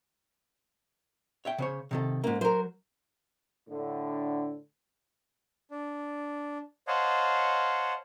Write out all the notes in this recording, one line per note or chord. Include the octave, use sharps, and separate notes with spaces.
C#5 E5 G5
C#3 C5 C#5
C3 D#3 A4
G#2 A#3 C#4
F#3 A#4 C5
A2 D3
D4
C5 C#5 D#5 F5 F#5 A5